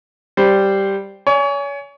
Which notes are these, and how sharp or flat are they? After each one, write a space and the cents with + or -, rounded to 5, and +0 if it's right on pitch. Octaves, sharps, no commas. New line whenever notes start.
G3 +0 C5 +0
C#5 +35 G#5 +0